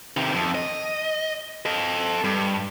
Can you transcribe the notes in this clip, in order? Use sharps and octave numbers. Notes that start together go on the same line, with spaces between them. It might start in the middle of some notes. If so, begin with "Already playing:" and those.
C3 D#3
F2
D#5
A4 D#5
G2